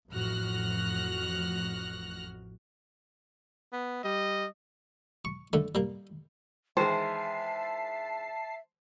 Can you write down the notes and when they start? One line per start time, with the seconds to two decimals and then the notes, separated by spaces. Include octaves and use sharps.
0.10 A1 F2 F#4 F6 F#6 A#6
3.73 B3
4.04 G3 D#5
5.25 C#6
5.53 D3 A3
5.75 G3 A#3
6.77 D#3 E3 G#3 C5 E5 A5 C7